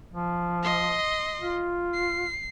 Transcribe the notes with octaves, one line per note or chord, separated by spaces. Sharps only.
F3
D#5 C6
F4
C7